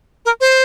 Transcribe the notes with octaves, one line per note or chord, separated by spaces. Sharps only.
A#4
C5